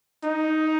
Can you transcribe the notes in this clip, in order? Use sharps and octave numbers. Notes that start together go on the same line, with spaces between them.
D#4